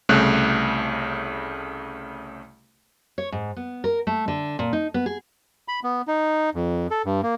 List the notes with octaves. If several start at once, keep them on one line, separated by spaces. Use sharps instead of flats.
C2 C#3 A3 F#6
C#5
G#2
B3
A#4
A3
D3
A#2
D#4
B3
G#4
B5
B3
D#4
F2
A4
G2
A#3